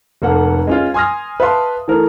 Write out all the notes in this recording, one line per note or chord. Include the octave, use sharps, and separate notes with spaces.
F1 A#3 A4 F#5
G#3 C#4 F4
G#5 C6 D#6 F6 A#6
B4 E5 F5 A5 C6
E3 A3 A4 A#4